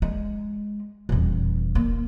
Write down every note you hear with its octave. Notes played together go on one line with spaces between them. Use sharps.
G#3
D#1 E2
A#3